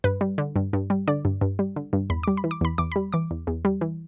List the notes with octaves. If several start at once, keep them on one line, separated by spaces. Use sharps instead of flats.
G2 B4
G3
D3
G2
G2
G3
D3 D5
G2
G2
G3
D3
G2
E2 B5
G3 D6
B5
E3
D6
E2 B5
E2 D6
B5
G3
E3 D6
E2
E2
G3
E3